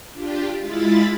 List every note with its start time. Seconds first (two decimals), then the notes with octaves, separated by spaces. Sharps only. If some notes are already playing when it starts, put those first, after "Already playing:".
0.12 D4 F4 G4
0.58 G#3 E4 F4 B5 A6